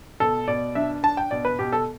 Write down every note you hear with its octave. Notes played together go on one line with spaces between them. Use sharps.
B2 A4
B2 D5
D4 E5
D4 A5
G5
B2 D5
B4
B2 G4
A4